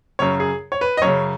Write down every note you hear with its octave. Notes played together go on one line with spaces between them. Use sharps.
F#2 C#3 C#5
G#4
C#5
B4
D#5
F#2 C#5
C#3